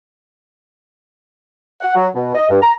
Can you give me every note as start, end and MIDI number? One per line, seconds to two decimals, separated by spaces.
1.81 1.94 78
1.95 2.08 54
2.14 2.35 47
2.35 2.46 75
2.49 2.61 43
2.62 2.72 82